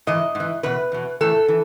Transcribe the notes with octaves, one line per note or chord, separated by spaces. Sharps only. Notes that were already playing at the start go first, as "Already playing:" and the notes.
G#2 E3 D#5
G#2 E3
E2 B2 B4
E2 B2
A2 E3 A4
E3